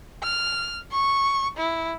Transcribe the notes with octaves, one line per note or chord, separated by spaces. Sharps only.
F6
C#6
E4